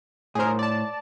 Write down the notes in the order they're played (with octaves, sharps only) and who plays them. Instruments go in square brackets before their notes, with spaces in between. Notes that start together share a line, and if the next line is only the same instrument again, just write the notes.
[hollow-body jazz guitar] A2 C5 [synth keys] G#4 A#4
[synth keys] D5 A5